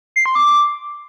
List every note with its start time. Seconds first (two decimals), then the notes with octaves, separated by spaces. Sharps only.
0.16 C7
0.26 C6
0.35 D6